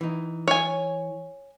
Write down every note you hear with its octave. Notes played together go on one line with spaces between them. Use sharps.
E3 D#4
C#5 G#5